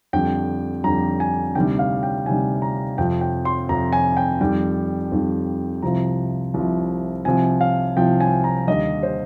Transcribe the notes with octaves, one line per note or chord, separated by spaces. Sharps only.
F2 D3 G3 G5
F2 D3 G3 A#5
G#5
D2 C3 D#3 G3 G5
F5
G5
D2 C3 D#3 G3 G#5
A#5
F2 C3 F3 G5
G5
C6
F2 C3 F3 A#5
G#5
G5
F2 D#3 G3 G5
F2 D#3 G3
C2 C3 F3 A#5
C2 C3 F3
C2 C3 F3 G#5
F5
C2 C3 F3 G5
G#5
A#5
D#2 D3 G3 D#5
C5